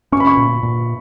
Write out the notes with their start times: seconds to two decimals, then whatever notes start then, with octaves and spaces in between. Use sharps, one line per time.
0.12 C#4 C#6
0.20 B5
0.27 C#6
0.37 A#2
0.63 A#2